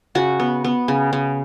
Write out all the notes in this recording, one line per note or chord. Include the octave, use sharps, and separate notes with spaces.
C#3 F#4
B3
B3
C#3
C#3